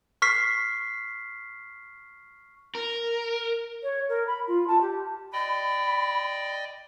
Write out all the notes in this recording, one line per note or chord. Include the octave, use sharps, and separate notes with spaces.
C#6 F6 B6 C7
A#4
C#5
A#4
B5
F4
A5
G4
D5 D#5 G5 B5